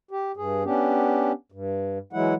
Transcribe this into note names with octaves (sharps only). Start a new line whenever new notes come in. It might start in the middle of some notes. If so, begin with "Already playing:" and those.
G4
G2 G#4
B3 C#4 D4 G4
G2
E3 F#3 G#3 E4 F#5